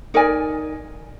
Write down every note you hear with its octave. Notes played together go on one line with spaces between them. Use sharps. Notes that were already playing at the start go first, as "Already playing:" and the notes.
D#4 A#4 D5 G#5